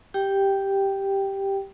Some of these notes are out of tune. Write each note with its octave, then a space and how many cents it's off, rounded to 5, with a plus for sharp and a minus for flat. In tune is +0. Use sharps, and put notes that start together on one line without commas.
G4 +0 G5 +0